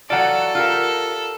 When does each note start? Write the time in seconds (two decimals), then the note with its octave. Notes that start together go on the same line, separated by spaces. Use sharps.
0.10 E3 F#3 F4 A4 D5 F#5
0.55 F4 G4 A#4